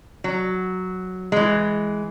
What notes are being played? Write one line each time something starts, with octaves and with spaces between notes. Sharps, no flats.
F#3
E3 G#3